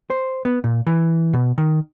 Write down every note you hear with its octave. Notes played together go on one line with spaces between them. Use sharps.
C5
B3
A#2
E3
B2
D#3